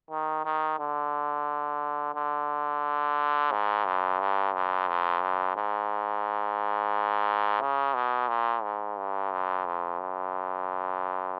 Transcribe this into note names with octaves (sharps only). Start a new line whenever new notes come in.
D#3
D#3
D3
D3
G#2
F#2
G2
F#2
F2
F#2
G#2
C#3
B2
A#2
G#2
G2
F#2
F2
F#2